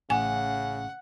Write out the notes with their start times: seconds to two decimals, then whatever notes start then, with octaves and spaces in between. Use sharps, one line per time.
0.10 A1 C#3 F#5 G#5